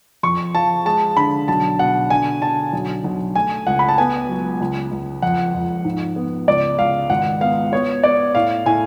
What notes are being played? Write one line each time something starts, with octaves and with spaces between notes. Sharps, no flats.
F2 C#6
F3 A5
G#3 A5
D3 B5
B1 A5
B2 F#5
D3 G#5
D3 A5
B1
B1
A3 G#5
C#2 F#5
B5
A5
B3 G#5
F#3
C#2
C#2
F2 F#5
F2
G#2
B3
C#2 D5
C#2 F5
G#1 F#5
B3 F5
B3 C#5
B3 D5
A2 F5
A2 G#5